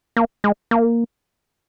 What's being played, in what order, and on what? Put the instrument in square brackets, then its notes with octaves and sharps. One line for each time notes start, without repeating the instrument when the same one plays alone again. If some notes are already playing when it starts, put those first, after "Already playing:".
[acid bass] A#3
G#3
A#3